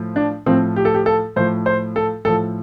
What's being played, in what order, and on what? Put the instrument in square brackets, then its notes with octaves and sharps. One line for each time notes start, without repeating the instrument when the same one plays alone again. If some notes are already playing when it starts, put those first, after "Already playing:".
Already playing: [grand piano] A2 F3
D4
A2 F3 C4
G4
A4
G4
A4
A2 F3 C5
C5
A4
A2 F3 A4